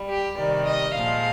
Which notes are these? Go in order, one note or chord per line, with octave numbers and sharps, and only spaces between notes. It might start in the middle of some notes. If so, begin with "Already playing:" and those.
Already playing: G3
G4
C3 D#3 G3 D5
D#5
A#2 F3 G#3 F5